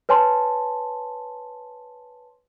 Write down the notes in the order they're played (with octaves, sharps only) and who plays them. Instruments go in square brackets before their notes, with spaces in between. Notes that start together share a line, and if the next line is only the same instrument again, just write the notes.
[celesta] B4 C#5 G#5 A5 C6